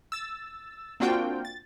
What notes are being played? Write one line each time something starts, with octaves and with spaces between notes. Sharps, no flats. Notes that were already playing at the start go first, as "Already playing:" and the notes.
E6 A6
A#3 C4 D4 F4 F#4 G5
A6